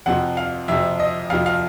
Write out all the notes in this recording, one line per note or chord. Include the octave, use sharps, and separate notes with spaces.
F2 C3 F3 F#5
F5
F2 C3 F3 E5
D#5
F2 C3 F3 F5
F5